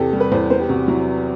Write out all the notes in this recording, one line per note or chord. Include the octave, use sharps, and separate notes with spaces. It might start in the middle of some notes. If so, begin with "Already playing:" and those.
Already playing: E2 C3 G4 A4
G3
B4
E2 C5
B3 C5
G4
C3 F#4
F#3 E4